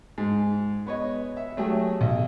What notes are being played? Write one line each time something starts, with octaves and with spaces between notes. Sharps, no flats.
G#2
B3 C#5 D#5
E5
F#3 A3 G4 G#4
B1